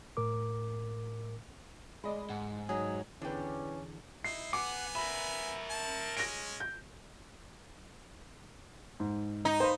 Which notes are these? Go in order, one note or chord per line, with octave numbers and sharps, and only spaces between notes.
A2 A#4 D6
G#3 D5 D#5 B5
G#2 F#5
F#3 D#4 G#4
E2 D3 C#4 D4 E4 G4 B4
D#4 E4 C7
B3 F#5 G#5 D6
A#4 E5 B5
A5
G#3 C#4 A#6 D7
G6
G#2
D#4
C5 F5 B5